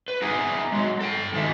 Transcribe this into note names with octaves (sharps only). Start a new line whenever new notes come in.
B4
B3 D#4 G#4 E5 G#5
F#3 G#3
A4 G5
D#3 G#3 F4 D#5 E5